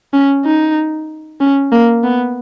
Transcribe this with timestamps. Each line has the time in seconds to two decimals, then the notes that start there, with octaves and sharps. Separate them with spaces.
0.13 C#4
0.45 D#4
1.40 C#4
1.72 A#3
2.04 B3